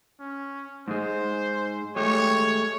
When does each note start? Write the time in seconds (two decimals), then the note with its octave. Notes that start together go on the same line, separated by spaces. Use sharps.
0.20 C#4
0.88 G#2 G#3 C5
1.96 G#3 A3 G4 C#5